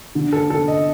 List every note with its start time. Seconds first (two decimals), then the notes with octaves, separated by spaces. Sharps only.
0.15 D3
0.33 A4
0.50 D3 A4
0.68 D#5